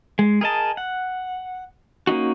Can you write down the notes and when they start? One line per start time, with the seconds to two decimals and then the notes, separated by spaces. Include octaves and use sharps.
0.19 G#3
0.41 G#4 A#4 D#5 A5
0.77 F#5
2.07 A#3 C#4 D#4 F#4